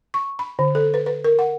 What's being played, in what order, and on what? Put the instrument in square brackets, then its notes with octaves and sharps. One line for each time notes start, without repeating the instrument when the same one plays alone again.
[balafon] C#6
B5
D3
A4
B4
B4
A#4
F#5